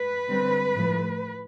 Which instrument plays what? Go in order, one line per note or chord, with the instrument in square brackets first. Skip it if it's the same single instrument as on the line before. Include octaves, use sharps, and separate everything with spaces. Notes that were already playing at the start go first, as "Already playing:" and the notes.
Already playing: [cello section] B4
D3 G3 C4
A2 F3 A3